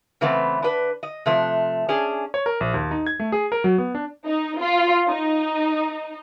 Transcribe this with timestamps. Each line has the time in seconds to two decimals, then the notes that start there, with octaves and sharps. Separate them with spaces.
0.21 C#3 E3 A3 B3 C4
0.62 D4 B4
1.03 D#5
1.26 C3 F3 A3
1.89 C#4 D4 G#4
2.34 C#5
2.46 A#4
2.60 A#1
2.74 D#2
2.91 D#4
3.07 G#6
3.20 A3
3.32 G#4
3.52 A#4
3.64 F#3
3.78 B3
3.95 D4
4.26 D#4
4.59 F4
5.09 D#4